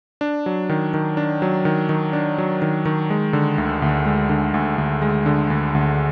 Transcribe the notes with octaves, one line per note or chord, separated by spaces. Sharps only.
D4
F#3
D#3
D#3
D4
F#3
D#3
D#3
D4
F#3
D#3
D#3
G#3
D3
D2
D2
G#3
D3
D2
D2
G#3
D3
D2
D2